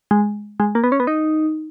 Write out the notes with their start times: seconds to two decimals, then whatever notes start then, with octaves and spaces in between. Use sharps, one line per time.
0.11 G#3
0.60 G#3
0.75 A#3
0.84 B3
0.92 C#4
1.00 B3
1.07 D#4